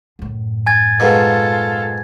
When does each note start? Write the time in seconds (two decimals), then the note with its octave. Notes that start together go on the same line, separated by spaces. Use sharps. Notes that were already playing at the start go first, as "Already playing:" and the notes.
0.19 F#2 A2
0.66 G#5 G#6 A6
1.00 G#2 B2 F4 A4